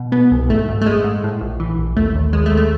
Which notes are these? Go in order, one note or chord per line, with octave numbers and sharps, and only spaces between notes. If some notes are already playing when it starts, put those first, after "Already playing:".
Already playing: B2
B2 B3
C2
G#1 A3
G#2
A3
G#2 G#3
G#2
A2
A#1
E3
A#1
D#2 A3
D#2
D#2 G#3
A3
D#2
A3